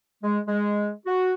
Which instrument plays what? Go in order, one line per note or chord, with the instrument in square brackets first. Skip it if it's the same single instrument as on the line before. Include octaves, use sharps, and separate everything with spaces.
[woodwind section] G#3
G#3
F#4